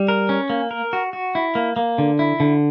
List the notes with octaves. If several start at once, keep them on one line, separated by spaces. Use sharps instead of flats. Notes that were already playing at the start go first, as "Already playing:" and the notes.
Already playing: G3
A#4
C#4
A#3
A#4
F#4
F#4
E4
A#3
A#3
D3
E4
D3